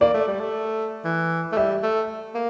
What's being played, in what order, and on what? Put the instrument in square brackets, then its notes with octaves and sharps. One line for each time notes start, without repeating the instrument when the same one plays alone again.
[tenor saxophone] A#3 [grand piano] D5
[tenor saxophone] A3
G3
A3
E3
A3
[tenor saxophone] G3 [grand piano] E5
[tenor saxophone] A3
A#3